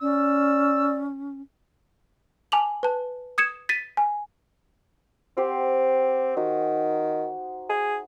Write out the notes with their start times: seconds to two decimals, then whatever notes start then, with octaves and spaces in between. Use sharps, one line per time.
0.01 C#4 D5 E6
2.52 G#5 A5 D6 F7 F#7
2.83 B4 A5
3.38 D#6 G#6 C#7 E7
3.69 A6 B6 D#7
3.97 G#5
5.37 C4 G4 C5 F#5
6.37 D#3 D#4 F#4
7.70 G#4